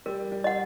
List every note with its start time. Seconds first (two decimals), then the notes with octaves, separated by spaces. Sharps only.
0.06 G3 A#4
0.32 G3
0.44 D#5 F#5